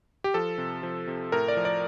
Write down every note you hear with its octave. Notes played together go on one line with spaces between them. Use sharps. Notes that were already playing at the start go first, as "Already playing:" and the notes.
G4
F3 A4
C3
F3
C3
A2 A#4
D5
F3
D5